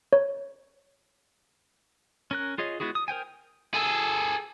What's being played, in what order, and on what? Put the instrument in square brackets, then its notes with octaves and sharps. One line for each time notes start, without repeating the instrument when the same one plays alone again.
[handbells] C#5
[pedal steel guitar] C#4 A#4 F#6
F4 G#4 C#5 D#5
G#3 B3 E4 F#4 G#4
D#6
A#4 C5 G5 G#5
[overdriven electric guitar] G#4 A4